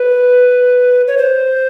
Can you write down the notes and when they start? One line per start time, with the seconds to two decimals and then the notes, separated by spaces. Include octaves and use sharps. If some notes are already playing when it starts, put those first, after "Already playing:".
Already playing: B4
1.07 C#5
1.18 C5